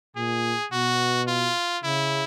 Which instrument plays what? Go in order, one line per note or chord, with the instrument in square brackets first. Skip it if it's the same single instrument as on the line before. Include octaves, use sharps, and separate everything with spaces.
[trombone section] A#2 [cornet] G#4
[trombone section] B2 [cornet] F#4
[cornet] F4
[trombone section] C#3 [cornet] E4